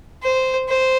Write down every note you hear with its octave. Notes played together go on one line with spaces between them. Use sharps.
C5
C5